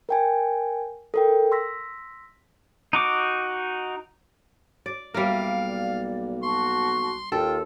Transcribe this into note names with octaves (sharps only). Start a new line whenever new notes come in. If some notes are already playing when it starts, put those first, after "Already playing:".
A#4 G5 G#5
A4 A#4 G5
C6 E6 A#6 B6
D#4 F#4 D6
D5
B1 G3 A#3 A#4 E5 F5
D5
F#4 A5 C6 C#6
D#2 F4 A4 G5